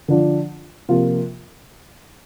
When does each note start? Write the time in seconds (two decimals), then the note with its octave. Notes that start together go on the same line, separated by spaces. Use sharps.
0.08 D3 F3 D4 F4
0.89 C3 F3 A#3 F4